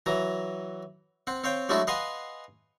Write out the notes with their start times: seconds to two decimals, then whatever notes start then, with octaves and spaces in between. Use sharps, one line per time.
0.06 E3 F#3 A#5
1.27 C4 F#5
1.44 C4 C#5 F5 G5
1.69 F#3 G#3 A3 D4 E4 F#4
1.87 B4 D#5 F5 F#5 G#5 C6